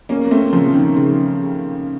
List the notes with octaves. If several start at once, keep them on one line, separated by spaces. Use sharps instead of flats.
A#3 C#4
A#3
A3 C4
C#3 F3
D#3
C#3